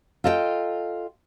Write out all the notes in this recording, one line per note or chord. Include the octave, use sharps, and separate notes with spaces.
F4 A4 D#5 F5 G5